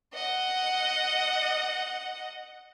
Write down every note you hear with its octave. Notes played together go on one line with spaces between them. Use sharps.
D#5 F#5